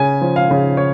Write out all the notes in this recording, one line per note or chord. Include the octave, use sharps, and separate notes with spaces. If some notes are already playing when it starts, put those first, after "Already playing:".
Already playing: C#3 G#5
F3
F5
C#3
C#5